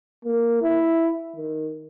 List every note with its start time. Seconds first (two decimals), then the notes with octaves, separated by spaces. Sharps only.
0.25 A#3
0.62 E4
1.36 D#3